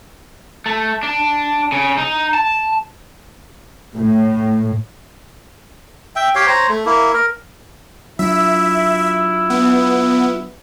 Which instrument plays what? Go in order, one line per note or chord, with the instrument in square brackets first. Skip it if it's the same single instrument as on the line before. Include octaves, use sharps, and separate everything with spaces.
[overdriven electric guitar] A3
D4
C#3
D#4
A5
[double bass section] A2
[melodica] E5 G5
G4 C#5 F5 G5
C5 C#5 A#5
A3
A#3 E4
A#4
[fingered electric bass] F#3 D4 [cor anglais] E4 [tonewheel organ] F4 [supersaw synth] E5
[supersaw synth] B3